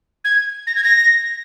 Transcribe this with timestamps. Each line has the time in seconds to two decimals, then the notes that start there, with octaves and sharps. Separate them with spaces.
0.24 G#6
0.67 A#6
0.75 G#6
0.83 A#6